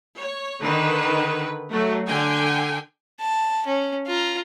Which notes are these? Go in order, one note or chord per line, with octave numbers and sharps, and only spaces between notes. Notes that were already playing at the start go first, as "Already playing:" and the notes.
C#5
D3 D#3 B4
F#3 A3
D3 G5 G#5
A5
C#4
F4 A#5